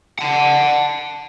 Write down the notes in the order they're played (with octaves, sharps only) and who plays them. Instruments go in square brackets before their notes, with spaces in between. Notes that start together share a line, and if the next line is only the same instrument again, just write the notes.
[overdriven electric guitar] F#5 A5